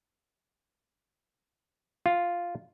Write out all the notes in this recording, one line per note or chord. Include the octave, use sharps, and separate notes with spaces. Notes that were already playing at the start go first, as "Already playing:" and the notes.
F4